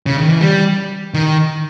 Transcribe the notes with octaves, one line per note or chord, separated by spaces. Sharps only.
C#3
D#3
E3
G3
D#3